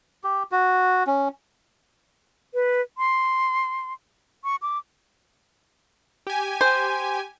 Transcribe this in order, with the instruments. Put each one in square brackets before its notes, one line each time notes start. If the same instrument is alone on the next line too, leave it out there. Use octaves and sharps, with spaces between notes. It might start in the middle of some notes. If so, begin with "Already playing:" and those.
[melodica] G4
F#4
C#4
[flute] B4
C6
C#6
D6
[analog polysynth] G4 G#5
[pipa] C5